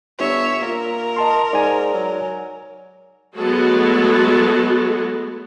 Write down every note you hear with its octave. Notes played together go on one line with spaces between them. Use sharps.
G1 C#5 E5
A#2 A#4
D#5 A5 C6
G#2 D5 G#5
F#3
F#3 G#3 A3 B3 F#4 A4